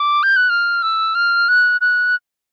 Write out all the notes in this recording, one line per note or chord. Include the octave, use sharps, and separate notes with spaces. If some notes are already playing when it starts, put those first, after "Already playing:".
Already playing: D6
G6
F#6
F6
E6
F6
F#6
F#6